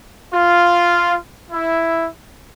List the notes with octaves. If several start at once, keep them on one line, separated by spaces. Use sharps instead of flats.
F4
E4